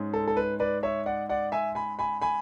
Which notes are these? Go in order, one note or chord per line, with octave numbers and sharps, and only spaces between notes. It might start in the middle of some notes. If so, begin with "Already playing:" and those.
Already playing: G#2 G#3 C#4
A4
A4
B4
B4 D5
C#5 E5
D5 F#5
D5 F#5
E5 G#5
G#5 B5
G#5 B5
G#5 B5